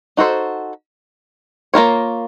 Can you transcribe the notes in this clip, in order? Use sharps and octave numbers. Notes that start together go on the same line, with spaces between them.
D#4 F#4 A4 C5
A#3 F4 A#4 C#5